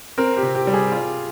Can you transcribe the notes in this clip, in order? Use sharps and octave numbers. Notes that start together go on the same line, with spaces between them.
C4 A#4
G4
C3
G4
G3
G#4
F4